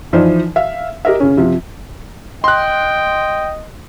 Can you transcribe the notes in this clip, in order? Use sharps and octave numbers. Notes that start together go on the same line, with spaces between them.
E3 F3 D#4 C5 D5
E5 F5
G4 A#4 D#5 E5
C#3 C#4
C3 F3
D#5 G5 C6 F#6